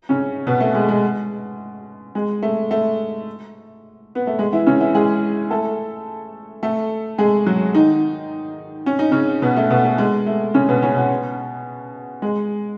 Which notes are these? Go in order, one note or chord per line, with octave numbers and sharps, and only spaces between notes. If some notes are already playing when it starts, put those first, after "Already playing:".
C#3 C#4
B2 B3
A3
G#3
G#3
G#3
A3
A3
B3
A3
G#3
E3 E4
C#3 C#4
E3 E4
G#3 G#4
A3 A4
A3 A4
G#3 G#4
F#3 F#4
D#3 D#4
C#4
D#4
C#3 C#4
B2 B3
A3
B2 B3
A3
G#3
A3
C#3 C#4
B2 B3
C#3 C#4
B2 B3
G#3